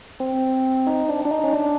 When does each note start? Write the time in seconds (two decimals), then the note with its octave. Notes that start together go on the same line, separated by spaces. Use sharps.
0.20 C4
0.87 D#4
1.09 D4
1.25 D4
1.31 D#4
1.44 C#4
1.53 D4